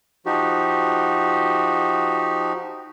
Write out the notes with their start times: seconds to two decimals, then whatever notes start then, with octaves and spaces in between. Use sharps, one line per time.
0.26 F3 D#4 F#4 G4